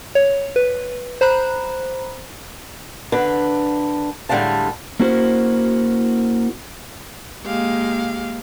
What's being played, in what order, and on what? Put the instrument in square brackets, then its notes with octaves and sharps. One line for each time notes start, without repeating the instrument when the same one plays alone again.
[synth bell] C#5
B4
C5 A#5 B5 F#6
[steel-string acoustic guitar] D3 D4 B4
A2 D3 G3 G#3 F5 A5
[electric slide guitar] A#3 C#4 E4 F#4 C5
[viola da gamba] G#3 A#3 [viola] G4 F5